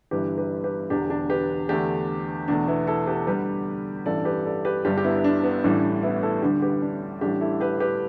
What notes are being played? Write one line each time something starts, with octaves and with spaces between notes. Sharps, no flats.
G1 G2 E3 G3 G4 B4
G4 B4
G4 B4
E1 E2 D3 D4 G4
D4 G4
G4 B4
E2 D3 A3 D4 G4
E2 B2 A3 D4
B3 E4
E4 A4
G4 B4
D2 D3 G3 G4 B4
A1 G2 E3 G3 A4 D5
G4 B4
A4 D5
G4 B4
G1 G2 G3 D4 G4
G4
B3 E4
D4
B3
A1 A2 E3 G3 D4
D4
B3 E4
E4 A4
D2 D3 G3 D4 G4
G4 B4
D4
A1 A2 G3 D4 G4
E4 A4
G4 B4
G4 B4